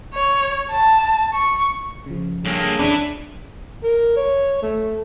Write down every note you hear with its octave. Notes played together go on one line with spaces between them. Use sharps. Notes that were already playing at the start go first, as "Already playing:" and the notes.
C#5
A5
C#6
C#3 F3
G2 A#3 G#4 A4 C#5
D#2 D4 E4 B4
A#4
C#5
A3